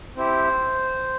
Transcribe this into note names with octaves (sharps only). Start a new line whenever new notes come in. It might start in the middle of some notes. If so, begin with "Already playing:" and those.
C4 E4 G4 C5